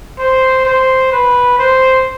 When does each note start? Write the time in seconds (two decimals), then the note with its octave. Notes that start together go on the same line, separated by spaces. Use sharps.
0.18 C5
0.65 C5
1.12 B4
1.59 C5